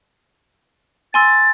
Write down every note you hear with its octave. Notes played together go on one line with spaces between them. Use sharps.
G#5 C6 E6 A6